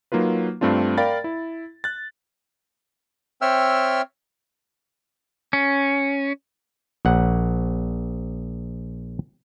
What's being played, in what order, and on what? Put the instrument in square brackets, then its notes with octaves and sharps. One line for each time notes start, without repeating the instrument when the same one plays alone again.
[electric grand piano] F#3 A#3 D#4 F4 B4
G2 A3 C4 D4 F4
A#4 D5 F5 G5 B5 A6
E4
F#6 A6
[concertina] C4 C#5 E5 G5 E6 F6
[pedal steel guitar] C#4
[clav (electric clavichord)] A#1 F#5